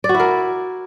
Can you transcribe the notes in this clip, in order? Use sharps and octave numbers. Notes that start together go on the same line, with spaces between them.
D5
F#4
E4
A#4